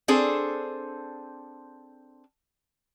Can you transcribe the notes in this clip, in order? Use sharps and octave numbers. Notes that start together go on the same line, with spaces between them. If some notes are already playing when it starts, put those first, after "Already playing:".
C4 D4 G#4 A4 C5